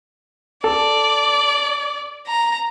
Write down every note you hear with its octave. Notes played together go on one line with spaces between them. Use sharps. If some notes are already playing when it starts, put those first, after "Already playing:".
A4 D5
A#5